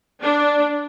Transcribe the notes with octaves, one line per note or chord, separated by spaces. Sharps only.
D4